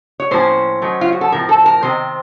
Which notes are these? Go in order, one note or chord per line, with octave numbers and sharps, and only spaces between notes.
C#5
A2 F3 A#3 C#4 C5
D#3 F#3 A3 C#4
F4
F#4
A4
A2 F3 C4 A#4
A4
A#4
C3 D#3 C5